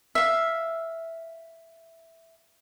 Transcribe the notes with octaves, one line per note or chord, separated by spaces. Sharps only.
E5 F5